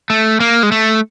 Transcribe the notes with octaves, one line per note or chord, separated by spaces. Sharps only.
A3
A#3
G#3
A3